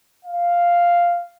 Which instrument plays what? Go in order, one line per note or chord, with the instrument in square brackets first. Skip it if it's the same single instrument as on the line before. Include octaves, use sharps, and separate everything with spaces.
[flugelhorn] F5